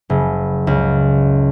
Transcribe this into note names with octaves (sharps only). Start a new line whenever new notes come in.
F#1
C#2